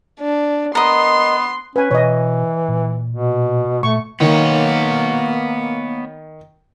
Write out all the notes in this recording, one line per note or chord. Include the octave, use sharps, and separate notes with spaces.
D4
B3 A#4 D#5 C6
C#4 B4 G#5
B2 E3 C#5 D#5
A#2
B2
A#2 A3 C#6
D#3 A#3 B3 C#5